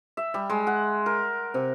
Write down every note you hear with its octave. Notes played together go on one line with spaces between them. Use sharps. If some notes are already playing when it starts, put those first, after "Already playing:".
E5
G3
G#3
F#5
A#4
C3